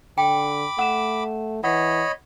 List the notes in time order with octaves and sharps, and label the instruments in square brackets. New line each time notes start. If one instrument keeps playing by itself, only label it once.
[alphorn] D3 [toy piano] G5 [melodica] B5 D6
[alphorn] A3 [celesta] F#5 E7
[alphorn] E3 [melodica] C#5 D#5 B5 [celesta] F#5